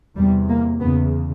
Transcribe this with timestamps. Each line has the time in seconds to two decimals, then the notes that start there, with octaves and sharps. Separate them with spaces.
0.16 E2 C3 G3
0.48 A#3
0.81 E2 C#3 B3